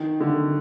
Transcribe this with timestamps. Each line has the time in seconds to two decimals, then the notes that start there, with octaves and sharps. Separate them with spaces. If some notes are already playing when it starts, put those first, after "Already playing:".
Already playing: D#3
0.20 D3